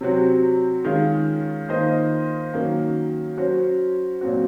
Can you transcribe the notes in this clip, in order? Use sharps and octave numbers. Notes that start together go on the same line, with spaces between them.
C3 F#3 C4 F#4
D#3 G#3 C#4 F4
D#3 A#3 F4 C5 D#5
D#3 F#3 A#3 C#4
F#3 C#4 F#4 C5
A#2 F#3 C4 F#4